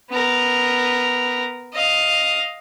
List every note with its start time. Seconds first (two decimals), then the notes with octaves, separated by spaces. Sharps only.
0.10 B3 A#4
1.73 D#5 F5